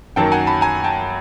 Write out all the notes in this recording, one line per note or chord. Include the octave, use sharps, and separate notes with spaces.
F#2 D#3 F#3 A#3 G5 A5
F#5 G#5
A5 B5
G#5 A#5
G5 A5